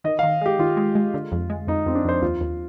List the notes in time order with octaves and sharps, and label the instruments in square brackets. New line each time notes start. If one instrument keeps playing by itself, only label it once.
[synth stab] D#3 [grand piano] D#5
[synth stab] D#3 [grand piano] F5
[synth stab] G#3 [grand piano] G4
[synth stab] D#3 [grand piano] F4
[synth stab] G#3
G#3
D3
F2
G#3
[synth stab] F2 [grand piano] D#4
[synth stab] F2 [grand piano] C4
[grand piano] D4
[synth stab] F2 [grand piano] C5
[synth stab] D#2 [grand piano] F4
[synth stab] D#2